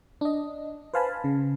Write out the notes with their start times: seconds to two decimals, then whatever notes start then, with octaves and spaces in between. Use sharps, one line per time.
0.21 D4 D#5
0.94 B4 C5 F5 G#5 A5 B5
1.24 C#3